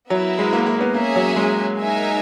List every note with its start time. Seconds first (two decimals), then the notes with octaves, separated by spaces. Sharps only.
0.10 F#3 B3 E4 A#4 E5
0.39 G#3
0.53 A#3
0.66 A#3
0.81 B3
0.94 A#3 C#4 G#4 C#5 E5 G#5
1.16 F#3
1.36 G#3
1.79 D#4 A#4 E5 G#5